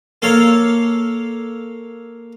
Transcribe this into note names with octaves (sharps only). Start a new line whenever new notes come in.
A#3 A4 C#5 F5